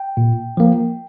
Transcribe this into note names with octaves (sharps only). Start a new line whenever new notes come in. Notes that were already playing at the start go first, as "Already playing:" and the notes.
Already playing: G5
A#2
F3 A#3